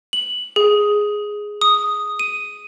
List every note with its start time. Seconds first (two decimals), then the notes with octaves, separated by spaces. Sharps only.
0.13 F#7
0.56 G#4
1.61 D#6
2.19 D#7